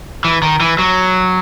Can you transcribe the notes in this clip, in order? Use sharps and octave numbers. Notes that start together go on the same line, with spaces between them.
E3
D#3
E3
F#3